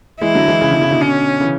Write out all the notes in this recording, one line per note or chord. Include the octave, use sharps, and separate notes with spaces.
E3 G#3 E4
D3 F#3
E3 G#3
C#3 E3
B2 D3
C#3
B2 D3
C#4
C#3 E3